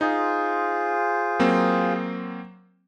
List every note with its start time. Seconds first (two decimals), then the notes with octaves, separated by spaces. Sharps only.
0.01 D#4 F4 G#4 C5
1.39 F#3 A#3 C4